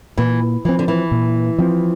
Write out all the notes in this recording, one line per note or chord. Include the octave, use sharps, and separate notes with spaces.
A#2 E3
E3 F3 C4
D3
E3
A#2
F3 C4